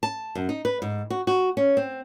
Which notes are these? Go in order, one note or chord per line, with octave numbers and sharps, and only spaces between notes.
A5
F#2
D#4
B4
G#2
F#4
F#4
C#4
C4